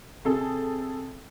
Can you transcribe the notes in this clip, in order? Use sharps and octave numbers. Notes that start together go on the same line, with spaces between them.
C3 G#4 A4